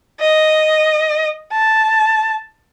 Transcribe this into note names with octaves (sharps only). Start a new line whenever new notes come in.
D#5
A5